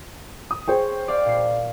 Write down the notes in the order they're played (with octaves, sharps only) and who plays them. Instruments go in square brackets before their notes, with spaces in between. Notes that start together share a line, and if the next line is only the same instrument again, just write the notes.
[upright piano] D#6
[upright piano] G#4 C5 G5 [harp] C#5
[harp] D5 F5
A#2 C7